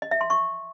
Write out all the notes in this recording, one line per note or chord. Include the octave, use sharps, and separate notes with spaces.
D#5
E5
C6
C#6